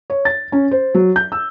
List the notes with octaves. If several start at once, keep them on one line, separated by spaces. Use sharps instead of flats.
C#5
A6
C#4
C5
F#3
G6
E6